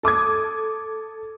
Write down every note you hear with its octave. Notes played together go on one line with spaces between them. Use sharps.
A4 D6 D#6 G#6